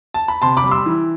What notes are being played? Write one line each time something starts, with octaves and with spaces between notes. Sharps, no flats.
A5
B5
C3 A5 C6
B5 D6
G3
C6 E6
E3